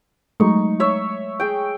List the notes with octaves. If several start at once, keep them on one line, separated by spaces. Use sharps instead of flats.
F#3 G#3 A3 D#4 C#6
C#5 E5 C#6
G#4 G5